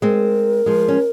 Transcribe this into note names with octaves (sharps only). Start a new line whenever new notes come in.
G#3 C4 A#4
F3 G#3
C#4